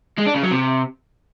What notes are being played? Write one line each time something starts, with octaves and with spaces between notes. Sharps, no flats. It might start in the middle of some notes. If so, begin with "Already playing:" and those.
G#3
D4
C#3
F#3
C3